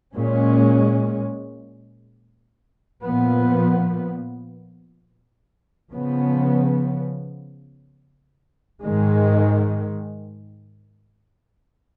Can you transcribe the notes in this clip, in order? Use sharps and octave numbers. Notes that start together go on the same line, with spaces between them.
A#2 G#3 C#4
A#2 F3 B3
C#3 F3 B3
G#2 D#3 G#3